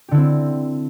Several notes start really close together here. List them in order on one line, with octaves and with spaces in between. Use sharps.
G4 D3 E4 C4